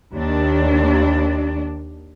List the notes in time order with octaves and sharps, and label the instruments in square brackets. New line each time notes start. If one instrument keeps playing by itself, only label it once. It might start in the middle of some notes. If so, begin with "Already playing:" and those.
[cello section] D#2 D4